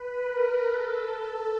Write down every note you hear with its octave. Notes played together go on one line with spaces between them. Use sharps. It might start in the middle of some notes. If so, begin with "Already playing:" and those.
Already playing: B4
A#4
A4